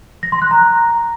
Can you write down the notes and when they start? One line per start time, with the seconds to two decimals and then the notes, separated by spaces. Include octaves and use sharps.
0.23 A#6
0.32 C6
0.42 F#6
0.51 A#5